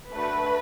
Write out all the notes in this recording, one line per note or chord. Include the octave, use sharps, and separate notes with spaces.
A3 D4 F#4 B4